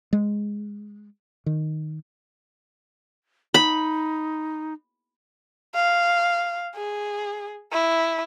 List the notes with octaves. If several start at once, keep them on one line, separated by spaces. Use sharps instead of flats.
G#3
D#3
D#4 B5
F5
G#4
E4